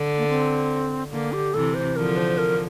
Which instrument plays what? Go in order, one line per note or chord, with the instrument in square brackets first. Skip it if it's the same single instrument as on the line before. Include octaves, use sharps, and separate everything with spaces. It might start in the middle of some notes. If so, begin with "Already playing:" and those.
Already playing: [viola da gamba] D3
[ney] A#3
C4
[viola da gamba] D3 [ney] A#3
[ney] G4
[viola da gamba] C3 E3 [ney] A4
[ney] C5
[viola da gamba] D3 F3 [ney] A#4
[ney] C5
A#4